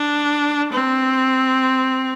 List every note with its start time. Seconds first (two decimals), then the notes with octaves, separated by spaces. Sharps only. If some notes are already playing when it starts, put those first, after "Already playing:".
Already playing: D4
0.72 C4